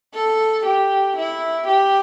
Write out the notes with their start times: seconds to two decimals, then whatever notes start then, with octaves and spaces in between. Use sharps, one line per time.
0.15 A4
0.66 G4
1.17 E4
1.68 G4